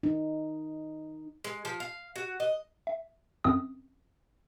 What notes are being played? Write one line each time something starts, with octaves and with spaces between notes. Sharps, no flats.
D#4
G#3
F3
F5
F#4
D#5
E5
F#2 C4 D#6